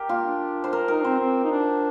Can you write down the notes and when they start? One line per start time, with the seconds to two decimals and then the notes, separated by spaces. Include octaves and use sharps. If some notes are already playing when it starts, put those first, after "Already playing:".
Already playing: G4 A#4
0.09 A#3 F4
0.25 D4
0.64 C5
0.73 A#4
0.88 D#4 A#4
1.04 C4 C5
1.20 C4
1.44 D#4
1.52 D4